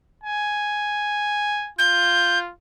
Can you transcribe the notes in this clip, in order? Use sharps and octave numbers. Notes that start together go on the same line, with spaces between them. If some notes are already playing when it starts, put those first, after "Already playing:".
G#5
F4 G6